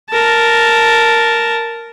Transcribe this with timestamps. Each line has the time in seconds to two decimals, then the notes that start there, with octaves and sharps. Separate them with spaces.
0.10 A#4 A5